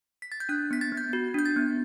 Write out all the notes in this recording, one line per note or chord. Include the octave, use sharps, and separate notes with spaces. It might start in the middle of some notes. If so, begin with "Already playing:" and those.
B6
A6
G6
D4 F#6
B3 B6
A6
B3
G6
F#4
D4 G6
A6
B3